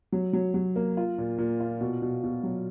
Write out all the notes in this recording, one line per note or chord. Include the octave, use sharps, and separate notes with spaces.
F#3
F#3
F#3
A#3
F4
A#2
A#2
F4
B2
B2
B2
F#3